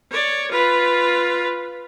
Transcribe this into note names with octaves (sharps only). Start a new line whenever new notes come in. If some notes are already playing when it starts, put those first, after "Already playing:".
C#5 D5
F4 B4